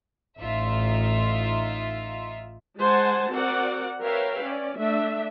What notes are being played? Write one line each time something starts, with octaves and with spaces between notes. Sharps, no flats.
A1 D#4 F4 E5
G#3 C5 F#5 G#5 A5
C4 F#4 A#4 D5 F#5
A#4 B4 C#5 E5 F5 G5
C#4 D5
A3 D4 E5